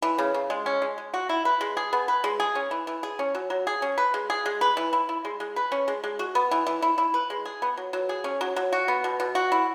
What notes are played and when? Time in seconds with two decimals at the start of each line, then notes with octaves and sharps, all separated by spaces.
0.02 E3
0.18 C#3
0.34 C#3
0.50 G#3
0.66 C#4
0.82 G#3
0.98 G#3
1.14 F#4
1.29 E4
1.45 B4
1.61 G#3
1.77 G#4
1.93 B3
2.08 B4
2.24 G#3
2.40 G#4
2.55 C#4
2.71 E3
2.87 E3
3.03 G#4
3.19 C#4
3.35 F#3
3.50 F#3
3.67 G#4
3.82 C#4
3.98 B4
4.14 G#3
4.30 G#4
4.46 G#3
4.61 B4
4.77 E3
4.93 E4
5.09 E4
5.25 G#3
5.40 G#3
5.56 B4
5.72 C#4
5.88 G#3
6.04 G#3
6.19 F#4
6.35 B3
6.51 E3
6.67 E3
6.82 E4
6.98 E4
7.14 B4
7.30 G#3
7.45 G#4
7.62 B3
7.77 F#3
7.93 F#3
8.09 G#4
8.24 C#4
8.41 F#3
8.56 F#3
8.73 F#4
8.88 B3
9.04 B2
9.20 B2
9.35 F#4
9.52 E4